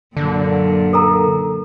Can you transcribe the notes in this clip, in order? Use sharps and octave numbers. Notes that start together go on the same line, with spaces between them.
F#2 A#2 D3
A4 A#4 A#5